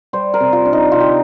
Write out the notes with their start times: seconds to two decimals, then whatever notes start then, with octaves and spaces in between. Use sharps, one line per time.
0.13 G3 C5
0.34 A#4
0.40 C3
0.53 F4
0.65 D4
0.73 D#4
0.92 C3 F4
1.00 G4